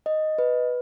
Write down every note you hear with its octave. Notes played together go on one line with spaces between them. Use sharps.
D#5
B4